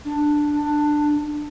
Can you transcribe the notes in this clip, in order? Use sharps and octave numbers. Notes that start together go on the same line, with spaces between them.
D4